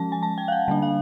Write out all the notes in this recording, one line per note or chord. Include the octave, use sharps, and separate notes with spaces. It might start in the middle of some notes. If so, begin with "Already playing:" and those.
Already playing: F3 G#3 C#4 A5
G#5
A5
G5
F5
F#5
D3 G3 A#3 D4
F5